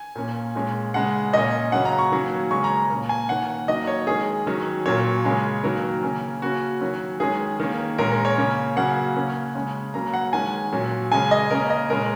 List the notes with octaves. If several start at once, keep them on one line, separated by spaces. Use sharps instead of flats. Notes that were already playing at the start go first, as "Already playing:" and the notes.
Already playing: G#5
A#2 A#3 C#4
A#2 G#3 C#4
C#3 G#3 C#4 F#5
A#2 A#3 C#4 D#5
C#3 F#3 A#3 C#4 F#5
A#5
C#6
D#3 F#3 A#3 C#4
C#3 G#3 C#4 C#6
A#5
A#2 A#3 C#4
G#5
D#3 A#3 C#4 F#5
D#3 F#3 A#3 D#5
C#5
D#3 G#3 C#4 G#4
D#3 F#3 C#4
A#2 F#3 A#3 C#4 C#5
C#3 G#3 C#4
D#3 F#3 A#3 C#4 A#4
C#3 A#3 C#4
C#3 A#3 C#4 F#4
D#3 F#3 C#4
D#3 G#3 C#4 G#4
D#3 A#3 C#4
A#2 G#3 C#4 A#4
A#4
C#5
C#3 A#3 C#4
C#3 F#3 A#3 C#4 F#5
C#3 A#3 C#4
C#3 G#3 C#4
C#3 F#3 A#3 C#4 A#5
F#5
D#3 G#3 C#4 G#5
A#2 F#3 C#4
C#3 G#3 C#4 G#5
D#5
C#3 A#3 C#4 A#4
D#5
A#2 G#3 C#4 A#4